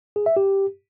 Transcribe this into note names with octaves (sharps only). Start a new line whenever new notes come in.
G#4
E5
G4